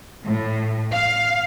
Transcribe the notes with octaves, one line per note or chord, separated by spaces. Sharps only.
A2
F5